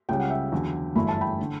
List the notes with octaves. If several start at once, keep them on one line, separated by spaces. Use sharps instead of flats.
C#2 C#3 G3 G5
F#5
E5 G5
E2 D3 F#3
G1 F#2 E3 A3 E4 B5
A5
G5 B5
D3